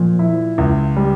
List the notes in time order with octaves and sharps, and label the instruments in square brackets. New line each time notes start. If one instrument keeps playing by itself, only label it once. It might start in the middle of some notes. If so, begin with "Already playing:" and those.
Already playing: [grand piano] A#2 [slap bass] F3
[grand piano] E4
C#2
G3